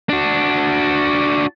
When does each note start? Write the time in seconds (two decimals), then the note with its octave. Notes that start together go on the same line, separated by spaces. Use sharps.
0.09 D4 F#4